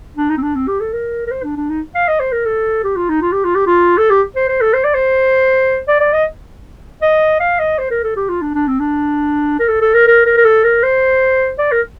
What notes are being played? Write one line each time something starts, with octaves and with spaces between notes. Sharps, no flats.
D4
D#4
C4
D4
C4
G4
A4
A#4
A#4
C5
D4
D4
D#4
F5
D#5
C5
A#4
A4
G4
F4
D#4
F4
G4
F4
G4
F4
A4
G4
C5
C5
A4
C5
D5
C5
D5
D5
D#5
D#5
F5
D#5
C5
A#4
A4
G4
F4
D4
D4
C4
D4
A#4
A4
A4
A#4
A#4
A#4
A#4
A4
A#4
C5
D5
A#4